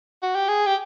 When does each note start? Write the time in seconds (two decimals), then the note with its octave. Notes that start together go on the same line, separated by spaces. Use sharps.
0.23 F#4
0.35 G4
0.48 G#4
0.66 G4